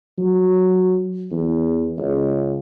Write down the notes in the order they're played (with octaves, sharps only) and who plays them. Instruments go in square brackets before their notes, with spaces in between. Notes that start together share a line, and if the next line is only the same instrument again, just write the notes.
[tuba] F#3
E2
C#2